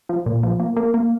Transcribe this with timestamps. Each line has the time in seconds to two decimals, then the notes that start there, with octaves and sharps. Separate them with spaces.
0.09 F3
0.26 A#2
0.43 F3
0.60 A#3
0.77 A#3
0.94 A#3